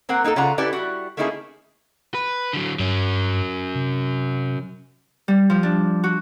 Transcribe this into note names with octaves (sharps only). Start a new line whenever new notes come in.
A#3 C4 A#4 F#5
A#3 D#4 G4 A4
C#3 F4 D5 F#5 A#5
C#4 E4 G4 A4 B4 D5
G3 E4 F#4
A3 A#3 C#4 D#4 E4 G#4
B4
D3 F#3
G2 F#3 C#4
C3
G3
F3
D4
F#4